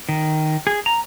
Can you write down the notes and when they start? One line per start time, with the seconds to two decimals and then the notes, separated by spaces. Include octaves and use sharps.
0.09 D#3
0.67 G#4
0.86 A#5